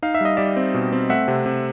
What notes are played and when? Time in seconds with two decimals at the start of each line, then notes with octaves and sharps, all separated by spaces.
0.02 D#4 F5
0.14 E5
0.21 G3 D#5
0.37 G3 D5 E5
0.56 C4
0.74 B2
0.93 C4
1.09 A3 E5 F#5
1.28 C3
1.46 C3